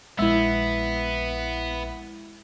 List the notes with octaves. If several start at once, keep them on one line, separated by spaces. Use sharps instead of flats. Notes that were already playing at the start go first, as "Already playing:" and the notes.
A#1 G#3 B3 E4 E5